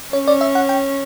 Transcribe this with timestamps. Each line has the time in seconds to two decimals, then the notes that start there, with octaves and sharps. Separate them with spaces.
0.13 C#4 C#5
0.28 D5
0.41 E5
0.55 F#5
0.69 G5